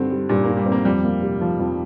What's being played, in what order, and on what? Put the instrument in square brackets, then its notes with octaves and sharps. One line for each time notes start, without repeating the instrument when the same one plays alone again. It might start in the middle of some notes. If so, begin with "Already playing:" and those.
Already playing: [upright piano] G2 C4 [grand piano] D3
[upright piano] G3
[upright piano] G2 [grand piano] A#2
[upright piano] G2 [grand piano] A#3
[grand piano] G3
[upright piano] C4
[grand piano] A#3
[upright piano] F2 [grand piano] G3
[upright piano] A#3
C3
[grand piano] F3 [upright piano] F4
[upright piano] F2